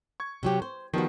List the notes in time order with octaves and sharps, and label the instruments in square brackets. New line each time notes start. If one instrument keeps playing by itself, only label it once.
[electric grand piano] C#6 G#6
[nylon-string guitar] C3 F#3 G4
C5
[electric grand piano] D#3 G3 B3 [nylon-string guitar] F3 F#4